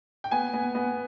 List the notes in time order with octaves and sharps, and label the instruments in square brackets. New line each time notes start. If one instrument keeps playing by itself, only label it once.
[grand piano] G5
B3 G#5
B3
B3